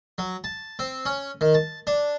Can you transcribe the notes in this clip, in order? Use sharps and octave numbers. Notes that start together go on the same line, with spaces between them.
F#3
A5
C4
C#4
D#3
A5
D4